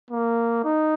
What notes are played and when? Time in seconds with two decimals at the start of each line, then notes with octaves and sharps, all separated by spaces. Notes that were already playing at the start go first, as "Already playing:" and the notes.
0.11 A#3
0.65 D#4